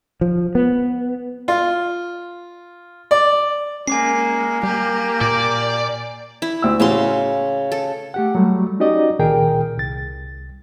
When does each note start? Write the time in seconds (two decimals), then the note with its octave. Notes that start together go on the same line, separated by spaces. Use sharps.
0.21 F3
0.55 B3
1.48 F4
3.11 D5
3.87 G#3 A#3 C#4 G#5 D6 C7
4.63 G3 A#3 G4
5.21 A#2 D5
6.42 E4
6.62 D2 E6
6.80 A2 C#3 E3 F#4 F5 C6
7.72 A4
8.14 A3 G4 F#5
8.35 F#3 G3 A3
8.80 C#4 D#4 F#4 G4 D5 D#5
9.19 C#2 A#2 D#3 G#4 A#4 G5
9.77 C2 A6